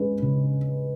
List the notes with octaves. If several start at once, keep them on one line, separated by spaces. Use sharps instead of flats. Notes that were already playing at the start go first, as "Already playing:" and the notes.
Already playing: G#3 C#4 B4
C#3